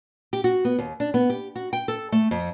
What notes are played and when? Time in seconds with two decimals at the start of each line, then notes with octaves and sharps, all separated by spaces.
0.33 G4
0.44 F#4
0.65 B3
0.78 D#2
1.00 D4
1.14 B3
1.30 G4
1.56 F#4
1.73 G5
1.88 A4
2.12 A3
2.31 F2